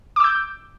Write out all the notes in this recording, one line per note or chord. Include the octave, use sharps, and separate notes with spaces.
D6 E6 G6